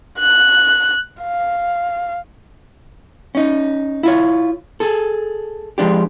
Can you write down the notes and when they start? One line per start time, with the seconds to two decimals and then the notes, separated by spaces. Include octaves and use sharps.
0.19 F#6
1.23 F5
3.35 C#4 D#4
4.03 E4 F4 C#5
4.80 G#4 A4
5.78 F3 G#3 D4 G4